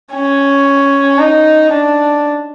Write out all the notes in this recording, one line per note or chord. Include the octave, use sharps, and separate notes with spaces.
C#4
D#4
D4